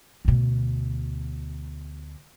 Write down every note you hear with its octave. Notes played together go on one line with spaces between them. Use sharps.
D2 B2